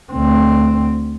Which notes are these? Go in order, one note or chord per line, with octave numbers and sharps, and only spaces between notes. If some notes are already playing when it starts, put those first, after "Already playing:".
D2 C4